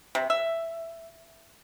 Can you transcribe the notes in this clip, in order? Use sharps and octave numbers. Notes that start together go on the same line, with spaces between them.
C3
E5